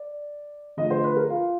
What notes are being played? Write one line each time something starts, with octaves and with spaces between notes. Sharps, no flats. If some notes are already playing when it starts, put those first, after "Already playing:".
Already playing: D5
D3 F3 A3 D#5
C5
B4
A#4
F4